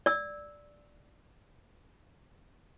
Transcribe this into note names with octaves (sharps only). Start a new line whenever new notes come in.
D5 E6